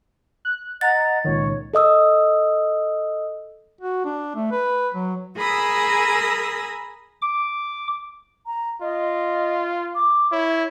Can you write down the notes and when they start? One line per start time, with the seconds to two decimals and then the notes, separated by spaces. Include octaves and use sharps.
0.45 F#6
0.81 D#5 F#5 A#5 A6
1.24 C#2 A#2 D#3 C#5
1.74 A4 D#5 D#6 E6
3.81 F#4
4.05 D4
4.35 A3
4.52 B4
4.94 F#3
5.37 G#4 A#4 G#5 B5 D#6 E6
7.22 D6
8.46 A#5
8.81 F4 D#5
9.95 D6
10.32 E4 C#5